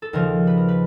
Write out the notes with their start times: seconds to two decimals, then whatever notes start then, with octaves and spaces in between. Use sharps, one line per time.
0.02 A4
0.13 D#2 C#3 F3 A#4
0.47 B4
0.57 A#4
0.68 B4